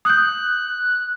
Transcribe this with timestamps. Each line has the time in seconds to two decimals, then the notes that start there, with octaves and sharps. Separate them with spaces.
0.05 D#6 F#6 G6